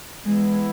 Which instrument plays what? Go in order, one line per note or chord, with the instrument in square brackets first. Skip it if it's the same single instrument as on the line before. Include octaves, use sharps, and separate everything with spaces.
[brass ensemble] E3 B3 E4 [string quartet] G#3